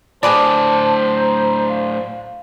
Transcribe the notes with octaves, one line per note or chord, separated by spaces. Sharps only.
A2 D3 G#4 B4 C5 D5 A5
A#5
F5